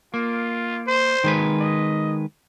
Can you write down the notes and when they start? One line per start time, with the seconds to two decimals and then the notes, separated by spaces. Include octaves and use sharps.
0.14 A#3 F4
0.87 C5
1.24 D#3 G#3 B4
1.60 D#5